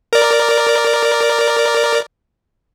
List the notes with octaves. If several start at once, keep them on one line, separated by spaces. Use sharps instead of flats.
A#4 D5